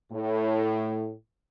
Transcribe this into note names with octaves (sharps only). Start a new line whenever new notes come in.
A2